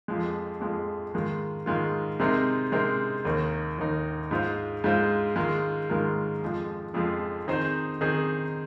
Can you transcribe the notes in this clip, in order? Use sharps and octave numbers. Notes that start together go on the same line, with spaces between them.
F2 F3 G#3
F2 F3 G#3
G#2 D#3 G#3 F4
G#2 D#3 G#3 F4
C3 G#3 C4 D#4 A#4
C3 G#3 C4 D#4 A#4
D#2 D#3 A#3 D#4
D#2 D#3 A#3 D#4
G#2 G#3 F4 C5
G#2 G#3 F4 C5
G#2 D#3 G#3 F4 A#4
G#2 D#3 G#3 F4 A#4
F2 F3 G#3
F2 F3 G#3
D#3 C4 D#4 G#4 C5
D#3 C4 D#4 G#4 C5